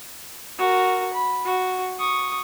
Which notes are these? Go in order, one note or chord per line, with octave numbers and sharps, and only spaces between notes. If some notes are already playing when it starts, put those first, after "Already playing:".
F#4 A#4
B5
F#4
C#6 D#6